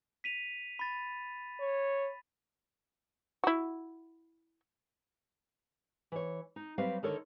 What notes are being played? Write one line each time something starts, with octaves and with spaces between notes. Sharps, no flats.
B6 D#7 F7
B5 A6
C#5
E4 F#4
E3 C#5
D#4
F#3 G3 C4 G4 B4 F5
D3 D#3 A4 A#4 C#5